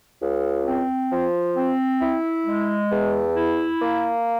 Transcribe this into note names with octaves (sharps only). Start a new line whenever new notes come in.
C#2
C4
F3
C4
E4
G#3
E2
E4
A#3